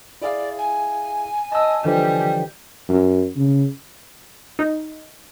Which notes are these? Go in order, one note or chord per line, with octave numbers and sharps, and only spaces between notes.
E4 G#4 D5 F5
G#5
D#5 A5 E6
D3 E3 F3 G3
F#2
C#3
D#4